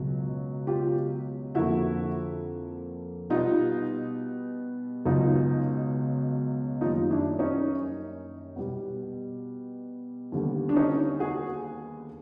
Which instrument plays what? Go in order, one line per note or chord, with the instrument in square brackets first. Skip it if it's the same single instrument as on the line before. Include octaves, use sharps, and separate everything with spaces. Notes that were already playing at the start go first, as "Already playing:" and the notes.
Already playing: [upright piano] C#2 B2 F#3
F4 G4
F2 D3 F3 A#3 E4 F#4
B2 G3 B3 D#4 F4
C#2 B2 F#3 D#4 F4
F#2 D#3 G3 A#3 D#4 F4
D4 E4
C#4 D#4
B2 G3 B3
D#2 D3 G3 B3
D4
C#4 D#4
F#4 G#4